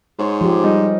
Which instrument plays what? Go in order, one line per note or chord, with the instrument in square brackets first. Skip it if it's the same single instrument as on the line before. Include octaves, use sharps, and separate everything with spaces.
[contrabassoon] G#2 [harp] C5 C#5 G#5
[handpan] F3 G4
[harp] G3 D#4 A#4